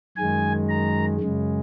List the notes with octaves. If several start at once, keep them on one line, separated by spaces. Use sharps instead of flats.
F#2 D#3 G#3 G#5
A#5
F#2 C#3 G#3